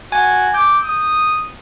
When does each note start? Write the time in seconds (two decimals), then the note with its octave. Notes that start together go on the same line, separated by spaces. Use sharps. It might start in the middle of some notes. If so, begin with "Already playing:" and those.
0.12 F#4 G#5 G#6
0.54 D6 G6
0.83 D#6